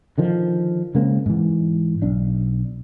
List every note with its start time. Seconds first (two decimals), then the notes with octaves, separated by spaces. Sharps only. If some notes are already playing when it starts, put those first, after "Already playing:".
0.18 D3 D#3 F3
0.95 C#3 G#3 A#3 C4
1.26 G#2 E3
2.02 B1 D4